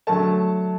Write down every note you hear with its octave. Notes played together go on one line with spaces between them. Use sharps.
D3 F#3 A3 A5